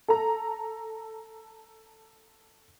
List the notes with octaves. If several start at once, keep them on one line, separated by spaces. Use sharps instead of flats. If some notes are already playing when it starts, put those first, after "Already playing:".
A4 A#5